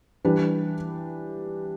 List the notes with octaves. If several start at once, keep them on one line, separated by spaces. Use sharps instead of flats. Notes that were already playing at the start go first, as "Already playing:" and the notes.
E3 G3 D4 G4 B4